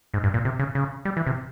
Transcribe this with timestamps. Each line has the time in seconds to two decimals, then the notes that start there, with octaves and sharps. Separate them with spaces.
0.14 G#2
0.24 G2
0.34 A#2
0.45 C3
0.59 C#3
0.75 C#3
1.05 G3
1.17 E3
1.27 C3